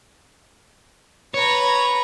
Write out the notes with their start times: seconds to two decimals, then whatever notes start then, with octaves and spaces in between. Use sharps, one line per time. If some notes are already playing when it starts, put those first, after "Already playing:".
1.34 B4 C#5 A#5